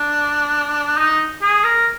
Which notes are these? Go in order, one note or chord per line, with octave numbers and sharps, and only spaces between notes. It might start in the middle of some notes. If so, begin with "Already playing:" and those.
Already playing: D4
D#4
G#4
A#4